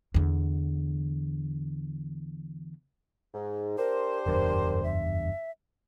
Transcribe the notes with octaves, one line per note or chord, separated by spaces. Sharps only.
E2 D3
G#2
D4 G4 A#4 C5
F#1 E2 G2 A#4
E5